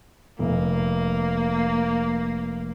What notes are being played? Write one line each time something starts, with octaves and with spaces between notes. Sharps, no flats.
F1 A#3